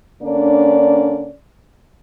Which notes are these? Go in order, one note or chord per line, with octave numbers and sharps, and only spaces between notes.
D3 A#3 C#4 D4 D5